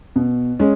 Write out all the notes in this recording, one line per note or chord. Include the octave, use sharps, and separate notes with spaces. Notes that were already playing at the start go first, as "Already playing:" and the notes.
B2
G#3 C#4